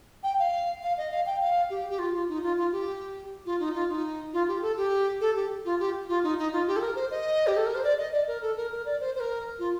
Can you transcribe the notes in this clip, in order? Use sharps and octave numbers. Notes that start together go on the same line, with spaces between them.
G5
F5
F5
D#5
F5
G5
F5
G4
G4
F4
F4
D#4
F4
F4
G4
F4
D#4
F4
D#4
F4
G4
A4
G4
A4
G4
F4
G4
F4
D#4
D#4
F4
G4
A4
A#4
C5
D#5
G4
A4
A#4
C5
D5
D#5
D5
A#4
A4
A#4
A#4
D5
C5
C5
A#4
F4